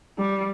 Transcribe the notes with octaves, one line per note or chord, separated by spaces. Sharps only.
G3